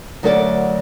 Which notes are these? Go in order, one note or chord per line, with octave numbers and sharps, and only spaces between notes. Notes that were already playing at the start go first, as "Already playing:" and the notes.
D2 F#3 A3 A#4 C#5 D5